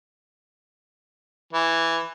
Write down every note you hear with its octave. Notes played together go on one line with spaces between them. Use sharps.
E3